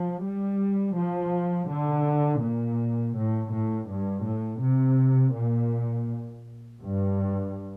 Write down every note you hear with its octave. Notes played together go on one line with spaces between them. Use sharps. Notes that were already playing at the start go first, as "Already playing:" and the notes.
Already playing: F3
G3
F3
D3
A#2
A2
A2
G2
A2
C3
A#2
G2